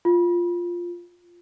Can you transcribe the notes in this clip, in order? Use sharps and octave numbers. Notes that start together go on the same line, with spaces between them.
F4